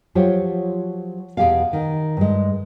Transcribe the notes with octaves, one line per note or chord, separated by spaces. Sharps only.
F3 F#3 F4 G4 C5 C#5
E2 B2 G#3 G4 G#4 F5
D#3
G2 G#3